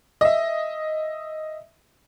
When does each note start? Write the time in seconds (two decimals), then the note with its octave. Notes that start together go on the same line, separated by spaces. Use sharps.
0.21 D#5 E5